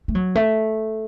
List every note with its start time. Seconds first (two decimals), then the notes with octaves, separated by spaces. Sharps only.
0.08 A3
0.15 F#3
0.35 A3